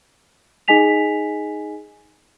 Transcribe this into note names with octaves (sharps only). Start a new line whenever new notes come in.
D#4 G#4 D#5 G#5 B6 F7